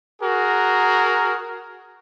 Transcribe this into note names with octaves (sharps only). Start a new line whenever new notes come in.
F#4 G#4 A#4